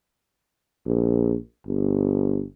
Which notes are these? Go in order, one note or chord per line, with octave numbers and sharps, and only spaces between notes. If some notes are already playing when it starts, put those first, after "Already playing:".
A#1
G1